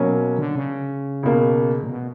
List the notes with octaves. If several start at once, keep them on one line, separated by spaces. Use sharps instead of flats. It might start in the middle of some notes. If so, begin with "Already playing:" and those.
Already playing: B2 F#3 A#3 C#4
D3
C#3
C#2 B2 A#3
A#2
B2